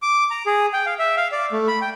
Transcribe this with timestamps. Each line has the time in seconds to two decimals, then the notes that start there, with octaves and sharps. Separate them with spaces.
0.02 D6
0.31 A#5
0.46 G#4
0.73 G5
0.86 F5
0.99 E5
1.17 F5
1.32 D5
1.52 A3
1.67 B5
1.82 G5